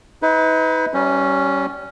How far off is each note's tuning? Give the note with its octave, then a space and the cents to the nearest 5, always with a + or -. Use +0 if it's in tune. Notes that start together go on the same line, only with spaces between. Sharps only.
D#4 +45 B4 +25
G3 -25 C#4 +0